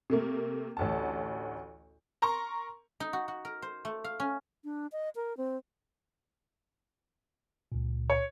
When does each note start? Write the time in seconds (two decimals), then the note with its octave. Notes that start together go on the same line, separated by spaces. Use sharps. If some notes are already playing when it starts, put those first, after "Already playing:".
0.10 C3 A3 A#3
0.77 A1 D2 A5
2.22 A#4 A#5 C6 C#6
3.00 D#4
3.13 F#4
3.28 F#4
3.45 A#4
3.62 C5
3.85 A3
4.04 F5
4.20 C#4
4.64 D4
4.92 D#5
5.16 A#4
5.37 C4
7.72 C#2 A#2
8.10 C#5